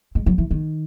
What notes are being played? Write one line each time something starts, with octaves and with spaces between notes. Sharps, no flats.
G#3
F#3
E3
D#3